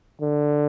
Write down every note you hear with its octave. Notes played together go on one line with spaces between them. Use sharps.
D3